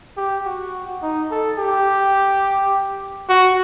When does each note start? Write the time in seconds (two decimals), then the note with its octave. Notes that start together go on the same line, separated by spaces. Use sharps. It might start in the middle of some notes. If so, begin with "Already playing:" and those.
0.17 G4
0.46 F#4
1.03 D#4
1.31 A4
1.59 G4
3.30 F#4